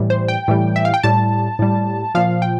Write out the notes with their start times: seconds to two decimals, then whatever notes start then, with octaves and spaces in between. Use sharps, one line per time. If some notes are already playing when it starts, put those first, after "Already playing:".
Already playing: A2 E3 G3
0.10 C5
0.28 G5
0.48 A2 E3 G3
0.76 E5
0.85 F5
0.94 G5
1.03 A2 G3 A5
1.59 A2 G3
2.15 A#2 F3 F5
2.42 G5